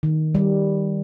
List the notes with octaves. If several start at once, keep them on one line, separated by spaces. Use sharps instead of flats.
D#3
G3